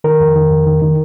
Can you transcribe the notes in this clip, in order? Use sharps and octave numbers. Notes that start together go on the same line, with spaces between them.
D#3 A#4
F2
D#3
F2
D#3
D#3